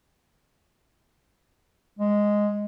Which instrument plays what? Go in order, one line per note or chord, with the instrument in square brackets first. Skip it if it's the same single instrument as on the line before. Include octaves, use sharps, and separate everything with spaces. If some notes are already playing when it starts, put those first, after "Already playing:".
[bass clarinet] G#3